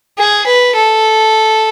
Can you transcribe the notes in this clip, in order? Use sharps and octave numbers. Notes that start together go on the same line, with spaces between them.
G#4
B4
A4